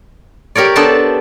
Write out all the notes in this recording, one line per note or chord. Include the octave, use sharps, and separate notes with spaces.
G4 A#4 C#5 D5
B3 D4 A4 C5 D5 A5